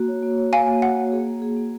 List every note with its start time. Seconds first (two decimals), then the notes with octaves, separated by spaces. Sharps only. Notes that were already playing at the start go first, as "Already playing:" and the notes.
Already playing: A#3 F#4
0.08 C#5
0.23 A#3
0.38 C#5
0.53 A#3 F5 G#5
0.67 A#3
0.82 F#4 F#5
0.97 A#3
1.12 G#4
1.27 A#3
1.42 G#4
1.56 A#3